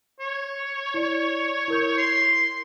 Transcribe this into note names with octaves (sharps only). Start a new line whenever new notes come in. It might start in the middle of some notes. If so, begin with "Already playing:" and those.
C#5
E4 D5
E4 A#4 G6
C6